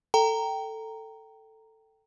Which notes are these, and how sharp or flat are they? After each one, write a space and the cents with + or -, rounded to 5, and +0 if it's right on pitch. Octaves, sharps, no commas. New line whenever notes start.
A4 +10 G5 -10 A#5 -5